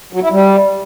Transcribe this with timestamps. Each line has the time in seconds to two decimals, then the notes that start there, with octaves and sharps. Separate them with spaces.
0.13 F#3
0.22 E4
0.32 G3